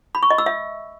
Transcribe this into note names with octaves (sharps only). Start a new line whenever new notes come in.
B5
C#6
D#5
E6
E5